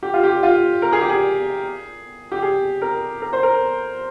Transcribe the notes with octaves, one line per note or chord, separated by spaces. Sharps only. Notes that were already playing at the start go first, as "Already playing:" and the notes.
G4
F4
G4
F4
A#4
G#4
G4
G#4
G4
G#4
A#4
A#4
C5
A#4